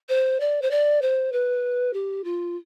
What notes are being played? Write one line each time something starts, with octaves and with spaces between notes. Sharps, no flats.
C5
D5
C5
D5
C5
B4
G4
F4